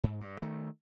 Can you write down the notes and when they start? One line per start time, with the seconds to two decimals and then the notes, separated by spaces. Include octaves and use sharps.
0.04 G#2
0.21 G2
0.42 D#3 A3